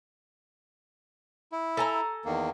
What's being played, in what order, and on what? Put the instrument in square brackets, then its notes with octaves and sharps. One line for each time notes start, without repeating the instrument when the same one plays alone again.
[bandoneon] E4
[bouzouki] A4 G#5 A#5
[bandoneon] E2 D#3 A#3